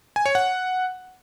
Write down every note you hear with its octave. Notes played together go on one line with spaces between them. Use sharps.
G#5
C#5
F#5